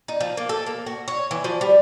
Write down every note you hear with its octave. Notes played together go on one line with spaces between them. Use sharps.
D#4
F3
A#3
A4
A#3
F#4
C#5
E3
F3
G3